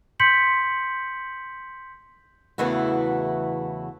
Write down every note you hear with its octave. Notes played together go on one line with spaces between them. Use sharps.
C6 G6 B6 C#7 F#7
E2 C#3 E3 A3 E4 F#4